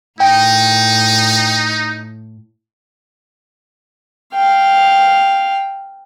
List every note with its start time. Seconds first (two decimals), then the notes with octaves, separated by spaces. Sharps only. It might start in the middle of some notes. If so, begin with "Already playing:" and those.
0.20 A2 D#4 G5
4.34 F5 G5